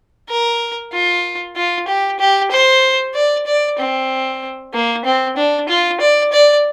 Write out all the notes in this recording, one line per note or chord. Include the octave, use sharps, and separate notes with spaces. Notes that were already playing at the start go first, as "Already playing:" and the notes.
A#4
F4
F4
G4
G4
C5
D5
D5
C4
A#3
C4
D4
F4
D5
D5